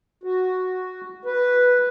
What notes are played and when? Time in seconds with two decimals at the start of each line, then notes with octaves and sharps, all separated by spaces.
0.24 F#4
1.25 B4